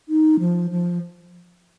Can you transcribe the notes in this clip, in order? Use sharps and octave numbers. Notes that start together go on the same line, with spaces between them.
D#4
F3
F3